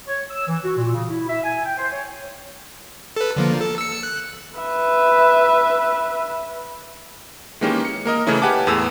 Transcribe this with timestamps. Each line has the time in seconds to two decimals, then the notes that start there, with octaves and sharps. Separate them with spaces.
0.08 C#5
0.31 E6
0.48 E3
0.63 F#4
0.77 A#2
0.94 C#3
1.09 E4
1.29 E5
1.44 G#5
1.65 G5
1.77 C5
1.91 C#5
3.16 A4 B4
3.36 D3 F3 A#3
3.61 A4
3.78 E6 C#7
4.03 F#6
4.59 B4 E5
7.61 D#3 E3 G#3 A#3 C#4 G4
7.85 C#7
8.05 A#3 A#4 D#5
8.27 C#3 E3 A3 C#4 E4
8.42 G4 B4 F#5 G#5 A5 D6
8.67 E2 A2 G#4 E6